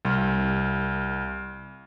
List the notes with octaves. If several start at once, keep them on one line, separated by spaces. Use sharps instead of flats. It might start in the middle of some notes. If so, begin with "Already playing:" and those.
C2 F6